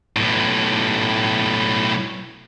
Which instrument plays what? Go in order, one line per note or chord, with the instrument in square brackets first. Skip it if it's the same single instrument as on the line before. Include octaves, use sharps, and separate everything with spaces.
[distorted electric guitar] B1 A2